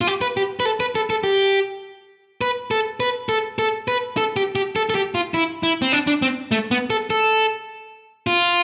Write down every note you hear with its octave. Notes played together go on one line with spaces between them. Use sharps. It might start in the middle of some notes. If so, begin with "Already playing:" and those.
F4
G4
B4
G4
B4
A4
B4
A4
A4
G4
B4
A4
B4
A4
A4
B4
A4
G4
G4
A4
A4
G4
F4
E4
E4
C4
D4
D4
C4
A3
B3
A4
A4
F4